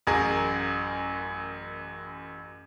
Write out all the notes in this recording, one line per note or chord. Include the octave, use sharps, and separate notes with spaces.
A1 F#2 G#4 A#4